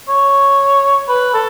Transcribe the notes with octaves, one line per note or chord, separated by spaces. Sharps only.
C#5
B4
A4